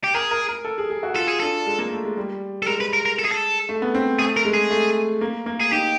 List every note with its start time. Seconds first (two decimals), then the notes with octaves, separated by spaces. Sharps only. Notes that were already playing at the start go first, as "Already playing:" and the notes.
0.04 G4
0.15 G#4 A#4
0.31 A#4
0.49 A#4
0.65 A4
0.78 G#4
0.90 G#4
1.03 F#4
1.15 F4 A4
1.28 G#4
1.40 D4 A4
1.66 G#3
1.79 A#3
1.91 A3
2.04 G#3
2.17 G3
2.62 A4
2.67 G#3 A#4
2.81 B4
2.93 A#4
3.06 A#4
3.19 A4
3.25 G#4
3.32 A4
3.69 A3
3.82 B3
3.95 C4
4.19 A3 G#4
4.37 A#4
4.45 G#3
4.54 G#4
4.71 A3
5.21 A#3
5.46 A#3
5.60 G#4
5.72 D#4 G4